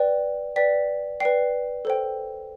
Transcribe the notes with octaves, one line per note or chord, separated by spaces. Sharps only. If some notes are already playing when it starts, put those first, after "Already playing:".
Already playing: B4 D5 G5
B4 D5 G5 B6
B4 D5 G5 C7
A4 C5 G5